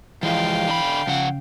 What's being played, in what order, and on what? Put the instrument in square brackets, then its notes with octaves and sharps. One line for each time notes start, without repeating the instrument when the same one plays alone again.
[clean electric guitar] E3 [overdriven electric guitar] F3 G#3 [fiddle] F5 G5
[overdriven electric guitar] D3 B5
[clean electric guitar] C#3 [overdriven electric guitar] F3 F#5